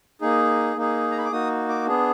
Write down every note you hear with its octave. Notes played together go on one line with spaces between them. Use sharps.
A#3 D#4 G#4
A#3 D#4 G#4
A#5
B5
D6
A#3 D#4 F#4 D#6
D6
B3 D4 G#4